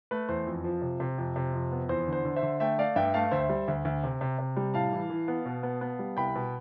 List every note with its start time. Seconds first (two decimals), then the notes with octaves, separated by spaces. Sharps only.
0.11 A3 B4
0.29 E2 C5
0.47 F2
0.64 F3
0.82 C3
1.00 C3
1.18 F2
1.36 C3
1.53 F2
1.71 B3
1.89 E2 C5
2.07 D3
2.13 C5
2.25 D3
2.36 C5 E5
2.43 D3
2.60 A3 E5 G5
2.78 A3 D5 F5
2.96 G2 E5 G5
3.14 A3 F5 A5
3.31 D2 C5 E5
3.49 G3
3.68 D2
3.85 D2
4.04 C3
4.21 C3
4.39 C3
4.57 G3
4.74 A2 F5 A5
4.92 E3
5.10 E3
5.28 B3
5.46 B2
5.63 B3
5.81 B3
5.99 G3
6.17 C2 G5 B5
6.35 B2